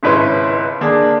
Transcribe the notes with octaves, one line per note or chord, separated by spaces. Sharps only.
G#1 C#2 E4 B4 C#5 C6
D3 A#3 D4 G#4